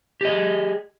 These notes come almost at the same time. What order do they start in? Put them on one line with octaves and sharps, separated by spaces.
G4 D#5 G#4